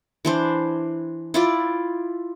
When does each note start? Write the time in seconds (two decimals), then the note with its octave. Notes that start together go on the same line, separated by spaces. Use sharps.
0.25 E3 D4 C5
1.34 E4 F4 D5